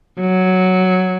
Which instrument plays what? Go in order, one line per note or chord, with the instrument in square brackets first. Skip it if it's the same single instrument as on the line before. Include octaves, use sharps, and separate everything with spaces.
[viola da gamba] F#3